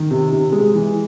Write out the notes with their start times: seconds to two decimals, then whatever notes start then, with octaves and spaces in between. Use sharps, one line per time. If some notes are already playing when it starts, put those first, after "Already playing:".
Already playing: D#3
0.11 C3
0.32 C3
0.52 G#3
0.74 E3